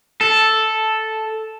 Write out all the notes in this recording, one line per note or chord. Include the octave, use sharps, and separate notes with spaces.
A4